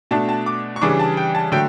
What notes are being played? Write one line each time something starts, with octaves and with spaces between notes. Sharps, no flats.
B2 A3 D4 A5
A5
D6
C#6
C#3 E3 G3 D4 D6
A5
G5
A5
D3 F#3 A3 G5